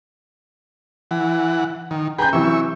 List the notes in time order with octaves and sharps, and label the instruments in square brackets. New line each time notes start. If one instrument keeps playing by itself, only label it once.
[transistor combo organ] E3 F#5
D#3
[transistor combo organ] G#4 B4 G5 [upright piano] A#5 G6
[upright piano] C3 E3 F#3 [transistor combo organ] E5 C#6